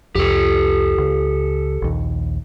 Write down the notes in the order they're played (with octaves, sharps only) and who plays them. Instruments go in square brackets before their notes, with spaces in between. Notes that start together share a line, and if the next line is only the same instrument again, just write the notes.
[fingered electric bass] C2 F2 [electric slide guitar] G4 A4
[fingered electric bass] C#2
A#1 D#2